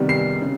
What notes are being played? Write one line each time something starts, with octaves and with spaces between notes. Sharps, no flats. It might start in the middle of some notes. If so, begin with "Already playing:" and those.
Already playing: C3 D#3 G3 B3
C7
C#3